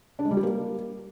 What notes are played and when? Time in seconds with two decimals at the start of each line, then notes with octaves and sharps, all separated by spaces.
0.19 D4
0.25 G#3
0.31 G3
0.37 G4
0.43 A#3